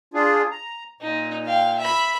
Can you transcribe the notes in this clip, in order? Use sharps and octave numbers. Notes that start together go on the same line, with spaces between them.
D4 F4 G#4
A#5
A#2 D#4
F5 G5
E5 B5